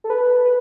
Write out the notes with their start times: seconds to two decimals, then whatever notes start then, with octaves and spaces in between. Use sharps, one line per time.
0.04 A4
0.10 B4
0.45 B4